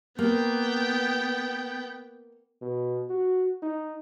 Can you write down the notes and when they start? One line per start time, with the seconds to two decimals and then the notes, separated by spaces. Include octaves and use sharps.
0.19 A#3 B3 G5
2.62 B2
3.10 F#4
3.63 D#4